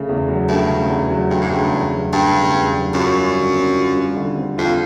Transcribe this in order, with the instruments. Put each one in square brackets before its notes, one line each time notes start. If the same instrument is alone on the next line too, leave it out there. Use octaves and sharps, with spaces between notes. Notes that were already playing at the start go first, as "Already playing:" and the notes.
Already playing: [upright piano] C#3 A3
E2
F#3
[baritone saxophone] G2 [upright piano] A3
[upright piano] C#3
E2
F#3
[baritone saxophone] G2 [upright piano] A3
[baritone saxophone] G#2
[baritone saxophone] G2 [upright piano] C#3
[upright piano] E2
F#3
[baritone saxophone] G2 [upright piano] A3
[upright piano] C#3
E2
F#3
[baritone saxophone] F#2 [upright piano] F4
[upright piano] G3
D3
C4
F4
G3
D3
C4
[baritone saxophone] F2 [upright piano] F4